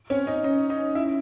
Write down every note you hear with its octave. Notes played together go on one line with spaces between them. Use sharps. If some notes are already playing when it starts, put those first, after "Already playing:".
C4 C#4 C#5
C#4 D#4 D#5
C#4 D#4 D#5
D#4 D#5
E4 E5